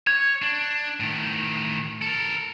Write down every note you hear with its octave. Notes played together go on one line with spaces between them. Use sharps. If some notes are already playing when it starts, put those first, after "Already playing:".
C#5 G#6
D4
A2 D#3
A4 A#4